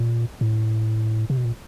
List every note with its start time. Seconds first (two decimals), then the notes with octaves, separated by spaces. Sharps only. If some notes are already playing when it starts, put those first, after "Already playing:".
Already playing: A#2
0.41 A2
1.30 C3
1.37 B2
1.45 A#2